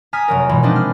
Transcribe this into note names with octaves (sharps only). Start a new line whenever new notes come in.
G#5 A#5 D#6 F6 B6
F1 F#3 A#4
G#2 B2 E3 G#3
F3 G#3 B3 C4 D4 D#4
F6